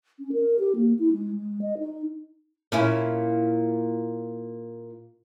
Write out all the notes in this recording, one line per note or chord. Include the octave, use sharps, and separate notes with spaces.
C#4
A#4
G4
A#3
E4
G#3
G#3
D#5
D#4
A#2 C#4 E4